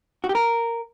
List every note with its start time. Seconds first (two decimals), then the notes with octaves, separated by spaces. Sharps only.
0.24 F#4
0.29 G4
0.35 A#4